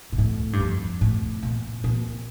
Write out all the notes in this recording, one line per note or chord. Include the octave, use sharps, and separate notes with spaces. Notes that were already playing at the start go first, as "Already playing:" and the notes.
A#2
A2
G2
F2
A2
A#2
A#2